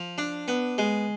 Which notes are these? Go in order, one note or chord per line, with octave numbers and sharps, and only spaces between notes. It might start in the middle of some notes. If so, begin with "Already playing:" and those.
Already playing: F3
D4
B3
G#3